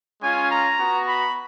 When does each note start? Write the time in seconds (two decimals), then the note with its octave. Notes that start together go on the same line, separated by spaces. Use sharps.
0.21 G#3 C#4 F4 G#5
0.50 A#5
0.79 B3 F#4
1.08 B5